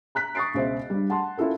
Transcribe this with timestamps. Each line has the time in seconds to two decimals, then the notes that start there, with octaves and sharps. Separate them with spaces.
0.15 A#5 F#6 B6
0.35 C#6 D#6 A6 C7 D7
0.54 C#2 B2 C5 E5
0.90 G2 G3
1.10 F#5 A5 C6
1.37 C#4 E4 F4 A4 A#4